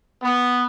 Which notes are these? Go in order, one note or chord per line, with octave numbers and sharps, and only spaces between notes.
B3